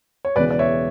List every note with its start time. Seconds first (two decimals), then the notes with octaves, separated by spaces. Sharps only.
0.25 C#5
0.36 E1 E2 C#3 E3 B4 D5
0.50 D5
0.59 C#5 E5